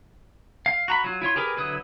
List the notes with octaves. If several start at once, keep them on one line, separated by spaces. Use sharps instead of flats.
F5
F#4 A#5 B5
F#3 F4
E4 F4 C#5 C6
G4 G#4 A#4 B4
D3 F#3 E4 B4 D#6